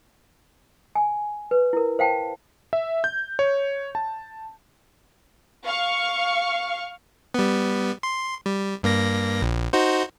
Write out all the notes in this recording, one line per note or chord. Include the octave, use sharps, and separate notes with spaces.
G#5
B4
E4 A#4
C5 F5 G5 A5
E5
G6
C#5
A5
F5 C#6
G3 B3
C6
G3
G2 A#3 A#6
A#1
D#4 F#4 C5